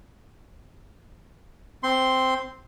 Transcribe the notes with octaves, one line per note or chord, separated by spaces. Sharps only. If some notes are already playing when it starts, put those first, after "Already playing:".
C4 C6